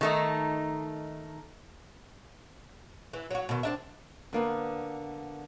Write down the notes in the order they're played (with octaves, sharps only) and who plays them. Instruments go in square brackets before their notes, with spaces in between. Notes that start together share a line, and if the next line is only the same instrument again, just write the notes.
[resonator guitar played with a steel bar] D#3 A3 D#4
[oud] E3
F#3 F#4
B2 D#3
C4 D4 E5
[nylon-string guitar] D3 A#3 B3